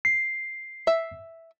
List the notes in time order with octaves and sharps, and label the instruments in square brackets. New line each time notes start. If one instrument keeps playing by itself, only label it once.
[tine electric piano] C7
[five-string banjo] E5